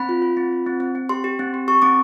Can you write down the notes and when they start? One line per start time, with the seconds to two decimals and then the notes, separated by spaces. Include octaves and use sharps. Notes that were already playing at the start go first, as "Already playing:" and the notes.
Already playing: C4 B5
0.09 F4
0.22 F4
0.37 C4
0.52 F4
0.66 C4
0.80 C4
0.95 C4
1.09 G4 C6
1.24 G4
1.39 C4
1.54 G4
1.68 G4 C#6
1.82 C4 D6